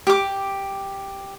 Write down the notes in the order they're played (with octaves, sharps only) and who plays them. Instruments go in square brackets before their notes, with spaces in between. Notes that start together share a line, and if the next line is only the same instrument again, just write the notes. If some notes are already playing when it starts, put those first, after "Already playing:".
[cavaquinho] G4 D6